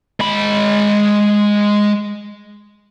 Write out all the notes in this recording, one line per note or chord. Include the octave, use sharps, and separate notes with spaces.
G#3 B5